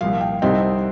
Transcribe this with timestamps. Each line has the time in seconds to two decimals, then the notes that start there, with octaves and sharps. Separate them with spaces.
0.01 C2 A#2 F3 F5
0.21 G5
0.42 C2 C3 G3 C4 D#4